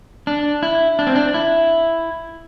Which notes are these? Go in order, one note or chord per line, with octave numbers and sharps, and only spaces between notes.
D4
E4
D4
C4
D4
E4